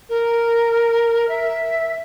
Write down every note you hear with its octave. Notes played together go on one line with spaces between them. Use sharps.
A#4
E5